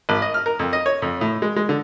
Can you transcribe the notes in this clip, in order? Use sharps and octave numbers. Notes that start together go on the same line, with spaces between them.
G#1
D#5
F6
A#4
F2
D#5
C#5
F2
A2
G#3
G#3
D3